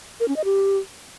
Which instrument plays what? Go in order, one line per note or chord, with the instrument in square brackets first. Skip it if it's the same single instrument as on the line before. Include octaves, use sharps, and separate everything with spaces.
[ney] A#4
C#4
D#5
G4